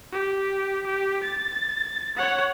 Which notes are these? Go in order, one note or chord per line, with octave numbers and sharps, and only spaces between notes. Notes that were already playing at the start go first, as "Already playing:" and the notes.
G4
G4
A6
C#5 F#5